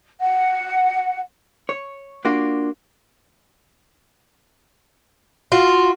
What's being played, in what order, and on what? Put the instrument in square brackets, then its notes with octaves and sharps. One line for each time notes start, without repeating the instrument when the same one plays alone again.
[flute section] F#5
[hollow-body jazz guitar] C#5
A#3 D4 F4 F#4
[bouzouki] F4 [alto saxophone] F#4